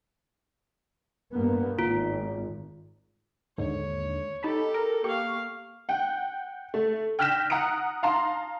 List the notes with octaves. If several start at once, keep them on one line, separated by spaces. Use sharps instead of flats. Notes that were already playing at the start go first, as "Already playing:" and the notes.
G2 A#3 B3
G#1 F4
D#2 G#2 D3 C#5
D#4 G4 A4 A5 B5
A#4
A#3 G4 F5 C#6
F#5 G5
A3
G5 F6 F#6 A#6 B6 E7
F#5 A#5 D#6 C#7 D7
F5 A5 A#5 C6